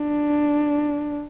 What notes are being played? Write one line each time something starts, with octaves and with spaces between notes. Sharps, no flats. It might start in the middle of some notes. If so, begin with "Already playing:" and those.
Already playing: D4